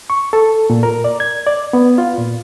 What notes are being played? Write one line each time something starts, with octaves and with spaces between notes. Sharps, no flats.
C#6
A4
A#2
A#4
D5
G#6
D5
B3
F4
A#2